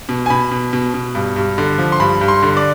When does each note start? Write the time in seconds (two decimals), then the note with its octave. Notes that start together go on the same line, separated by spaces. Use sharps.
0.09 B2
0.26 G#5
0.30 B2 B5
0.51 B2
0.73 B2
0.94 B2
1.15 G2
1.36 G2
1.58 D3
1.78 F3
1.92 C6
2.00 G2 B5
2.21 G2
2.28 C6
2.42 D3
2.57 D5